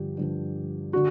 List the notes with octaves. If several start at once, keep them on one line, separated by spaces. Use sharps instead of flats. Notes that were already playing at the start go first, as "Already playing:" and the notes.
Already playing: G2 D3 F3 G4
G2 D3 F3
D3 F#4